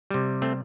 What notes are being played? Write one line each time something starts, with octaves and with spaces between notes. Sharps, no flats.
C3 G3
A3 C4